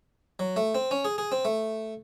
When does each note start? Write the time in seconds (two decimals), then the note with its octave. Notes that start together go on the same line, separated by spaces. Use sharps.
0.39 F#3
0.56 A3
0.75 C4
0.91 C#4
1.05 G#4
1.18 G#4
1.32 C4
1.45 A3